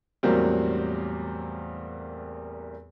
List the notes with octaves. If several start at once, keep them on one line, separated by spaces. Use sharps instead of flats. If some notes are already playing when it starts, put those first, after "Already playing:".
E2 A2 F#3 G3 A#3 C4